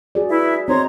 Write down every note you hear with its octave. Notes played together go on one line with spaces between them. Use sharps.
F#4 G#4 D5
E4 B4 E5
C4 D#4 C5 C#5 A#5 C6